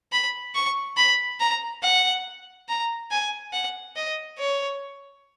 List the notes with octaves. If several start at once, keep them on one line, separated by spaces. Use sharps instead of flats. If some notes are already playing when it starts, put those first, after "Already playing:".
B5
C#6
B5
A#5
F#5
A#5
G#5
F#5
D#5
C#5